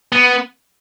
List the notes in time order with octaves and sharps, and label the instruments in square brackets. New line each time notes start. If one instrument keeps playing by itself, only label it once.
[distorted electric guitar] B3